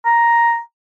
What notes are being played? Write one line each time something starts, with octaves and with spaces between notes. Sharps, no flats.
A#5